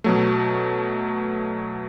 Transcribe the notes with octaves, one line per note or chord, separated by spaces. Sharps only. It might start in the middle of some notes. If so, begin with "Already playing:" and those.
B2 F#3 A3